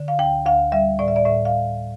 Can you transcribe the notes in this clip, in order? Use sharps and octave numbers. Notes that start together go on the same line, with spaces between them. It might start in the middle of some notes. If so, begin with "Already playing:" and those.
Already playing: D3
F5
D2 G5
D2 F5
G3 E5
A2 D5
E5
D5
A2 E5
F5